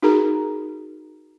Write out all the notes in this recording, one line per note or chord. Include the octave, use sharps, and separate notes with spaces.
D#4 F#4 G#4 A#4 A#5